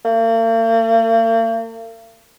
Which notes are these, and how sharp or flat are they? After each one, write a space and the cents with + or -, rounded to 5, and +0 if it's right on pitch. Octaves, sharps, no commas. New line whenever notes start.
A#3 -45